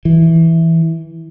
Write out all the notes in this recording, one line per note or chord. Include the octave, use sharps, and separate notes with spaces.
E3